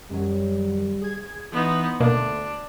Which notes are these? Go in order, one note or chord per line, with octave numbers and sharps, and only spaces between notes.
F#2 D#3 F#3 G3
G#4 G#6
E3 B3 D#4 C6
D2 B2 A#3 D4